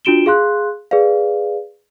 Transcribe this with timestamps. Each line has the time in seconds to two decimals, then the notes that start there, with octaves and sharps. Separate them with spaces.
0.05 D4 F4 F#4 D7 E7 G7
0.26 G#4 F5 C6 F#6
0.91 G#4 B4 D5 F5